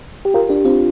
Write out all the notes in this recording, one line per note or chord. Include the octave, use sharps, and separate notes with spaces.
G4
F4 A#4
D4 G4
C4 F4